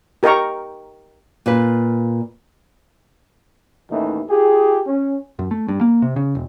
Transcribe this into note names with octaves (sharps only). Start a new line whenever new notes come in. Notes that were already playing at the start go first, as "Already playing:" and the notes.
G4 A#4 D#5 G5 A#5 C#6
A#2 F4 B4
A1 D#2 E3 A3 D#4
F4 G4 G#4
C#4
F#2
A3
G2
A#3
C3
C#3
E1